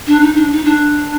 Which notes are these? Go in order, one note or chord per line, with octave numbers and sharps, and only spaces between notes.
D4
D#4
D4
D#4
D4